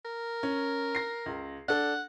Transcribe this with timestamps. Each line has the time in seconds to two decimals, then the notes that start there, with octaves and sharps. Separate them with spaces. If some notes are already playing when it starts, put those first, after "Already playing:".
0.05 A#4
0.43 C#4
0.95 A#6 C7
1.26 C#2
1.68 D4 A4 F#5